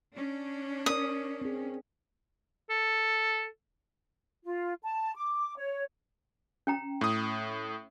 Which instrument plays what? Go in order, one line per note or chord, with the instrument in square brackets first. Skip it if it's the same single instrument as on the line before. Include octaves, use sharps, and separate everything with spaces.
[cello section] C#4 D4
[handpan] A#4 D5 [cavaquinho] D#6
[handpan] C4 G#4
[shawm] A4
[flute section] F4
A5
D6
C#5
[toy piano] C#4 G5 A#5
[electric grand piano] A2 D#6